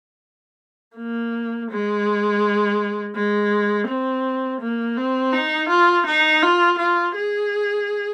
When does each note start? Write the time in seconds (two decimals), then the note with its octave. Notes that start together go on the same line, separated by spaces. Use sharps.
0.97 A#3
1.70 G#3
3.15 G#3
3.88 C4
4.61 A#3
4.97 C4
5.33 D#4
5.69 F4
6.06 D#4
6.42 F4
6.78 F4
7.15 G#4